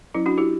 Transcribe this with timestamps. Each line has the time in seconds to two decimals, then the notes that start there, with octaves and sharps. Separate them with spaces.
0.14 F#3 C#4 E4
0.26 D4 F#4
0.38 E4 G4